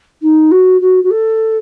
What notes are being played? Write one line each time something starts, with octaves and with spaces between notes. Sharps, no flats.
D#4
F#4
F#4
F#4
A4